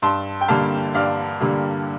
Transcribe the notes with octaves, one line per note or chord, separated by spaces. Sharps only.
G2 A5 C6
G5
D3 G3 A#3 F5 A5
G2 D5 F5
D3 G3 A#3